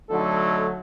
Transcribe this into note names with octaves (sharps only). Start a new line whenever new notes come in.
D3 F#3 A3 D#4 A4